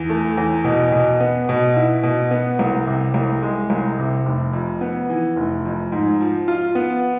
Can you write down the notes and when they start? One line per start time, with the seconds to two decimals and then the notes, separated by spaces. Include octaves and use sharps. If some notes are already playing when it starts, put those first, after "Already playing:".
Already playing: E2
0.09 A3
0.37 E2
0.64 B2
0.92 B2
1.20 B3
1.49 B2
1.76 E4
2.03 B2
2.31 B3
2.59 C2
2.86 C3
3.14 C2
3.42 G#3
3.70 C2
3.99 C3
4.25 F1
4.53 F2
4.81 B3
5.09 E3
5.36 F1
5.65 F2
5.92 G#2
6.21 F3
6.48 F4
6.75 B3